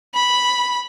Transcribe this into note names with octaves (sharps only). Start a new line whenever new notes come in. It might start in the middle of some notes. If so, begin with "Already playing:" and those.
B5